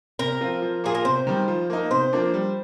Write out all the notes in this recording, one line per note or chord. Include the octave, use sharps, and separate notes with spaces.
C3 A#4
F3 C4 F4
F3
A#3 F4 G#4
A#4
C3 C5
D#3 G3
F3
A#3 D#4
C3 C5
F3 A#3 D4
G3